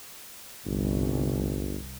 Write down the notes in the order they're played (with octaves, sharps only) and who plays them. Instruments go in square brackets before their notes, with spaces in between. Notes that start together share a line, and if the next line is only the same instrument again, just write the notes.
[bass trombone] G1 [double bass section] C2